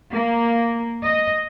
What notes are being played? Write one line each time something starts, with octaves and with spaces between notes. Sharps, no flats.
A#3
D#5